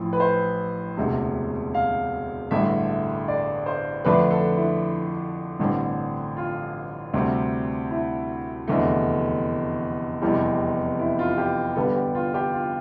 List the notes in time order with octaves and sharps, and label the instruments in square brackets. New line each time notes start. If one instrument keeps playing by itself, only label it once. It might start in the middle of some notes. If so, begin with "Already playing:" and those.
Already playing: [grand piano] A1 A2 F3
B4
C5
E1 D2 C3
F5
A1 G2 D3 A3 E5
E5
D5
C5
F2 D3 A3 D4 B4
A4
E4
A1 G2 D3 G3 C4
F4
D2 C3 G3 C4
E4
F1 E2 D3 A3
F1 E2 C3 E3 G3
E4
F4
G4
G2 D3 G3 B3 A4
G4
F4
G4
F4